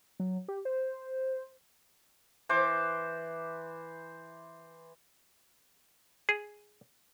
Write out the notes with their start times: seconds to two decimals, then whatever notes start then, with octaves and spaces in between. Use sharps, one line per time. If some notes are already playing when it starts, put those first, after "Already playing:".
0.20 F#3
0.48 G4
0.65 C5
2.49 E3 C5 D6
6.29 G#4